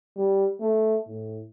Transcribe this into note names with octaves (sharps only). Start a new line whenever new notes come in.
G3
A3
A2